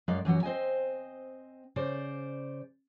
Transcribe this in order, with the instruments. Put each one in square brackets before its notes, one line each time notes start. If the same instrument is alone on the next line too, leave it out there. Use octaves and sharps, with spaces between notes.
[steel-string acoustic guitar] F#2 G#3 D5 D#5 F5
F#2 E3 F#3 F#4
C4 C5 D#5 G#5
C#3 C5 D5